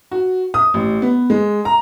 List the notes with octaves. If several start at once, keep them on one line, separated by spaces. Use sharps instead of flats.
F#4
D#6
A1
B3
G#3
A#5